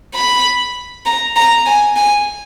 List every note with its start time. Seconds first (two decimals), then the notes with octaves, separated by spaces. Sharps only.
0.15 B5
1.06 A#5
1.36 A#5
1.66 G#5
1.96 G#5